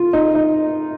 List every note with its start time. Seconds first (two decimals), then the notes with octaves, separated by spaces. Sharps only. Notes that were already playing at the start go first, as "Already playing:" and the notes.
Already playing: F4
0.13 D#4
0.35 D#4